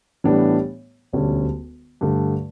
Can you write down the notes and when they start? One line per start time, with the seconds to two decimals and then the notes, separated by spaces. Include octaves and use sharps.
0.24 A2 E3 G3 B3 D4
1.13 E1 D2 D3 G3 C#4
2.01 G2 D3 A3